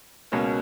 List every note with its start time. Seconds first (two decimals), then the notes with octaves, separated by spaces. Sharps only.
0.32 C#2 B2 A#3 C#4